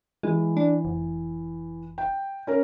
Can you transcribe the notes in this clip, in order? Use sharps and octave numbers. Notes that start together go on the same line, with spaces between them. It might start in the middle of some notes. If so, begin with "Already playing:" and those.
E3 G#3
D4
F1
G5
C#4 A#4